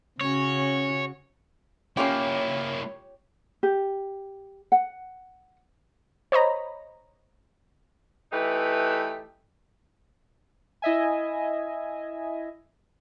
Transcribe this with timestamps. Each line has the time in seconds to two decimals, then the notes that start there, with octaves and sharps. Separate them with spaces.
0.21 C#3 C#4 F#4 C#5
1.97 A#3 C#4 E4 F4 G4 C#5
3.63 G4
4.72 F#5
6.32 C5 C#5 D#5 A#5 B5
8.32 E3 A3 D#4 G4 B4
10.82 E4 D#5 E5 G#5